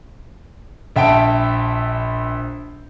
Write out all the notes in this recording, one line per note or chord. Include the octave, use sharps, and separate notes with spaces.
A#1 E5 G5 A5 D7